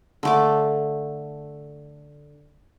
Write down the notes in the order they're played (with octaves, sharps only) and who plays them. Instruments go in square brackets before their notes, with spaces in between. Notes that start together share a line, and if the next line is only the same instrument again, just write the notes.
[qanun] D3 A3 D6